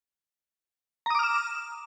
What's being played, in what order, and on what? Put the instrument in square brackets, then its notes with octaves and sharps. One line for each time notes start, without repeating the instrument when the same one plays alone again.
[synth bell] A#5
D#6
D6
F6
E7